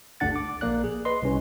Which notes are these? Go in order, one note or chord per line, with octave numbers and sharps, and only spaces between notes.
G1 D2 D4 F#5 A6
D6
A#1 A#3 D5 F#6
G#4
B4 D#5 C6
C2 C#4